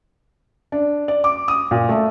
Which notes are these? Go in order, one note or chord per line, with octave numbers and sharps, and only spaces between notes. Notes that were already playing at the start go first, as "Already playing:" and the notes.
D4
D5
D6
D#6
A#2
A3